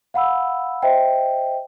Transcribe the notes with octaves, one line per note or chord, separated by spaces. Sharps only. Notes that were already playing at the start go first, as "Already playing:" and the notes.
F5 F#5 B5 E6
C5 D#5 E5 G5